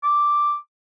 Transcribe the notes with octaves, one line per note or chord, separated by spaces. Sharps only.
D6